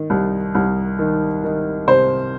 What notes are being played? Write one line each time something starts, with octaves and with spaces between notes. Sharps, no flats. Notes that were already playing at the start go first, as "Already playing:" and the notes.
Already playing: D#3
C2
C2
D#3
D#3
C3 C5